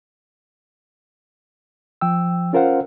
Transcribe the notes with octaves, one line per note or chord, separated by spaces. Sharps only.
F3 G5 E6
C#4 F4 A#4 C5 F5 F#5